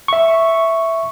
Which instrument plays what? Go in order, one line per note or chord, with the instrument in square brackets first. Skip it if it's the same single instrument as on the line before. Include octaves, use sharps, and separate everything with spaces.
[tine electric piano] E5 C#6